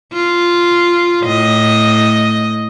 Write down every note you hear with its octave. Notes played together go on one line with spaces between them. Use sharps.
F4
A2 D#5